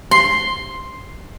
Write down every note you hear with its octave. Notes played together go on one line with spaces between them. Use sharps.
C6